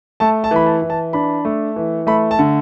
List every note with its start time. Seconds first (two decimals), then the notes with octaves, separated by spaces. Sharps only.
0.20 A3 A5
0.44 A5
0.51 E3 B5
0.66 A5
0.82 E3
0.90 A5
1.13 D4 B5
1.45 A3
1.76 E3
2.07 A3 B5
2.31 A5
2.39 D3